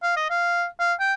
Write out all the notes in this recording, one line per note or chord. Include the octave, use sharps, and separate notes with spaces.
F5
D#5
F5
F5
G5